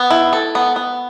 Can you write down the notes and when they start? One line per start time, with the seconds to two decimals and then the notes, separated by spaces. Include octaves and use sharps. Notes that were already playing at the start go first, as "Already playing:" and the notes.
Already playing: B3
0.10 E4
0.33 A4
0.55 B3
0.76 B3